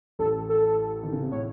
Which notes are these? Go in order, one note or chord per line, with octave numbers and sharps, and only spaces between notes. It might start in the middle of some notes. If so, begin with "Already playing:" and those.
A1 A2 A4
A4
D#3
C#3
C3
A2 C#5